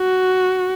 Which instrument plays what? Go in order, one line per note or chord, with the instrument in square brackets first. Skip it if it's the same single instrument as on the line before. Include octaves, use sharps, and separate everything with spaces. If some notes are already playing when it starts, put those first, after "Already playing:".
Already playing: [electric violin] F#4